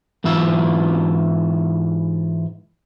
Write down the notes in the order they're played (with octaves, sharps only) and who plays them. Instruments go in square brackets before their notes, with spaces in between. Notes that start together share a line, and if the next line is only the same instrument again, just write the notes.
[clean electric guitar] G#2 E3 E4 F4 E5